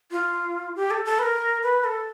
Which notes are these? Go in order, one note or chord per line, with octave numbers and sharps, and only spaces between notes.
F4
G4
A4
A4
B4
A#4
B4
A4